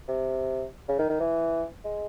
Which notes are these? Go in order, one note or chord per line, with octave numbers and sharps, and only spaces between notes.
C3
C#3
D#3
D#3
E3
G#3